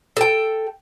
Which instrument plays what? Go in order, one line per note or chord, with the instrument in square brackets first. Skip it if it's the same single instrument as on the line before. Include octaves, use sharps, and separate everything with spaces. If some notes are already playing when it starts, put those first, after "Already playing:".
[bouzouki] A4 G5